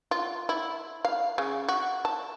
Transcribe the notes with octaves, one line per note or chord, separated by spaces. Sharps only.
F4
E4
F5
C#3
F#4
A5